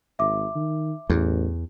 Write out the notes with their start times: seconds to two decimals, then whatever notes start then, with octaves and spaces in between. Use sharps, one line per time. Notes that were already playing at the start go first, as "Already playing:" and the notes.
0.19 G#1 E5 D6
0.55 D#3
1.10 A1 E2